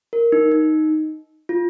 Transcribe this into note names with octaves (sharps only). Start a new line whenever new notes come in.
A#4
D#4
D#4
F4